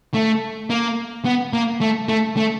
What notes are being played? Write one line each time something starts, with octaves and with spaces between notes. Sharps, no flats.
A3
A#3
B3
A#3
A3
A3
A3